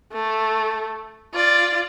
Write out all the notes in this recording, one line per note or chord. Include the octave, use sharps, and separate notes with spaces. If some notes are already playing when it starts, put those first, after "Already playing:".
A3
F4 D5